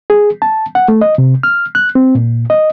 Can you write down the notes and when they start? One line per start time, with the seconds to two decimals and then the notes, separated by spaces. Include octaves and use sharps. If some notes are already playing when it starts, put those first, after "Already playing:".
0.10 G#4
0.42 A5
0.75 F#5
0.88 A3
1.01 D#5
1.18 C3
1.43 F6
1.75 F#6
1.95 C4
2.15 A#2
2.50 D#5